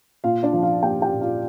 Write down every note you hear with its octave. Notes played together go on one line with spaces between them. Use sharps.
A#2 F4 F5
D4 D5
F3
F4 F5
A#3 G4 G5
G4 G5
A#2
F4 F5